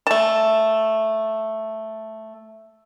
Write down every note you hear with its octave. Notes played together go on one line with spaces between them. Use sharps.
A3 A5